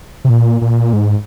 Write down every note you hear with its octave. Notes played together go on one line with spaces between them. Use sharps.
C3
A#2
A#2
G#2